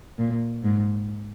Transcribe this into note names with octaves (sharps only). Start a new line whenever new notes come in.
A#2
G#2